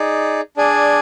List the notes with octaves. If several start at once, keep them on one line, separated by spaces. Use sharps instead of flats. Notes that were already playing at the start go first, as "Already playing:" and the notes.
Already playing: D#4 G#4 D5
D4 G#4 D5 G#5